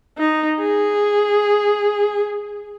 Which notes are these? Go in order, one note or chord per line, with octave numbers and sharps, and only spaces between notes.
D#4
G#4